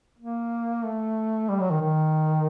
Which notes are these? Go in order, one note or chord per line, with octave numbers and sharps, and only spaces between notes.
A#3
A3
G3
F#3
D#3
D#3